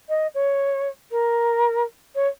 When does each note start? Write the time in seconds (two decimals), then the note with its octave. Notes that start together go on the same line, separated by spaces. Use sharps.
0.09 D#5
0.34 C#5
1.11 A#4
2.15 C#5